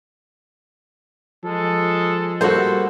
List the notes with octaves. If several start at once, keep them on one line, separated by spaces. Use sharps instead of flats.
F3 G#3 A4
G3 A#3 F#4 A4 C5